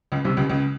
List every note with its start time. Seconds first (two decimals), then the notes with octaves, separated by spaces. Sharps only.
0.12 C#2 C#3
0.25 C2 C3
0.37 C#2 C#3
0.50 C#2 C#3